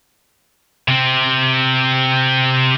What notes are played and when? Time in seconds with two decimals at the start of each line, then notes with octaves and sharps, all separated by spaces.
0.88 C3 C4